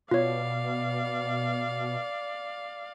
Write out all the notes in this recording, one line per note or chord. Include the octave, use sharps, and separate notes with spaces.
B2 F4 C#5 D5 F5